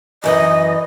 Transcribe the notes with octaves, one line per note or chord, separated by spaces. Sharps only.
F#2 E3 D#5